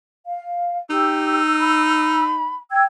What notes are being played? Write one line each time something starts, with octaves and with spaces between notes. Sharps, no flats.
F5
D#4 G4 E6
B5
G5 E6 G#6